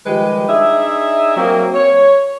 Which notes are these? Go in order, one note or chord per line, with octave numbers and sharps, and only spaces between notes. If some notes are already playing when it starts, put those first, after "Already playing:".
D#3 F3 G3 G#3 G4 B4
D4 D#4 G#4 E5
F#3 A#3 C4
C#5